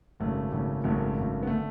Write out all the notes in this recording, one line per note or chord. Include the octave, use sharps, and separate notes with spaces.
G#1 F#2 C#3 A3
G#1 F#2 C#3
G#1 F#2 C#3 A3
G#1 F#2 C#3
B3
D3 A3